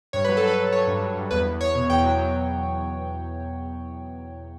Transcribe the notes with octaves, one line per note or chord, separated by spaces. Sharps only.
G2 C#5
F#3 B4
A4
F#3
B4
F#3
F#3 C#5
G2
F#3
G2
E2 B4
E2
E2 C#5
B2
E2 G5
F#3
F#3